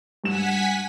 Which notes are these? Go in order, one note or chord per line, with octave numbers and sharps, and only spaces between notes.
G2 F#5 G#5 B6 E7